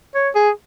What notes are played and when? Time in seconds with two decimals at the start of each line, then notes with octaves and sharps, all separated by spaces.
0.15 C#5
0.35 G#4